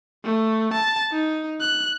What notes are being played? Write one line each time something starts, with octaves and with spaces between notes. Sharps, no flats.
A3
A5
D#4
F#6